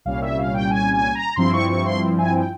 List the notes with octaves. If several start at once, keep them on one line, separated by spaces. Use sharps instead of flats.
C2 A#2 G3 C#4 F5
E5
F5
G5
G#5
G#5
A#5
G2 F3 C4 E4 C6
C#6
C#6
C6
G#5
G5